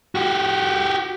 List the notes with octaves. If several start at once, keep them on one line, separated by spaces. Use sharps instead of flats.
F#4 G4